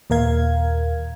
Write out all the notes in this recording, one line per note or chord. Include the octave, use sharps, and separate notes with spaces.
D#2 A#2 A#4 F5 G#6